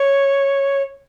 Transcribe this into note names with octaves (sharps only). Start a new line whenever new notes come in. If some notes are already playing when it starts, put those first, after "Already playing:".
Already playing: C#5